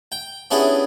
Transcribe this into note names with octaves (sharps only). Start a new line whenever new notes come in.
G5
B3 C#4 D4 E4 G4 G#4